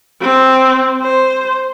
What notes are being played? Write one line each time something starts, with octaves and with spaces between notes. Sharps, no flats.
C4
C5